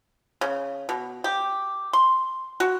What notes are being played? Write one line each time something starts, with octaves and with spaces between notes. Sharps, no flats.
C#3
B2
G4
C6
F#4